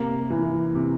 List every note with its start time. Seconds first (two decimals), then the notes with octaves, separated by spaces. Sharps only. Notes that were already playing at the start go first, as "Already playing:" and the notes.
Already playing: C3 A#3
0.30 E3
0.75 C3